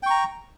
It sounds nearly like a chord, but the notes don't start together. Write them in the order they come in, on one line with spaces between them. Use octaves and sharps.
G5 C#6 A#5